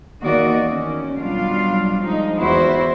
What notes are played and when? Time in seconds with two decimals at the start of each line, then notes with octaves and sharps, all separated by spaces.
0.21 E2 D#3 A#3 F#4 D5 D#5
0.66 D#3 C#4
1.17 B2 F#3 G3 D4 F4 F5
1.99 F3 G#3 D#4
2.39 E2 E4 F#4 C5